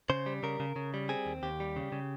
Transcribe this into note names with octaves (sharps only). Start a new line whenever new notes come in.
C#3 C5
G3
C#3 A#4
C#3
C#3
G3
C4 G#4
D#2
D#2 G4
G3
C#3
C#3